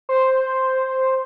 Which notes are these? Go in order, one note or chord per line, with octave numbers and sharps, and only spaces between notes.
C5